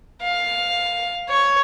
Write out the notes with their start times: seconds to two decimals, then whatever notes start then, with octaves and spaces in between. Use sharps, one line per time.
0.22 F5
1.29 C#5